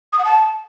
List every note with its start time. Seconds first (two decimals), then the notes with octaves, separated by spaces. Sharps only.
0.13 D#6
0.19 F#5
0.25 A5